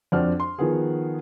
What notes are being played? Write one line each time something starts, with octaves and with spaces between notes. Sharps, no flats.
F2 C4 D4 F#4 F6
C6
D#3 F3 B3 F#4 G#4